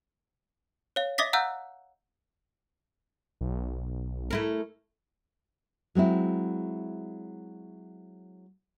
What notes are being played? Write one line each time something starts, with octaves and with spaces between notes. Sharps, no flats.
C#5 F5
D#5 E5 D6 D#6 A#6 B6
F5 F#5 A#5 E6 F#6 G6
B1
A3 E4 A#4
F#3 G#3 C4 E4